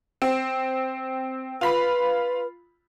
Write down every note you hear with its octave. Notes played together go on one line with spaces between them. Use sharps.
C4
F4 B4 B5